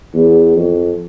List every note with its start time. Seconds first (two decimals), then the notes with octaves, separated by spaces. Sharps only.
0.14 E2
0.55 F2